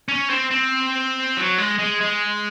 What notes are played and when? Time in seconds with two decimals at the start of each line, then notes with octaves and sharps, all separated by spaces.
0.08 C#4
0.30 C4
0.51 C4
1.36 F#3
1.58 G#3
1.78 G#3
2.01 G#3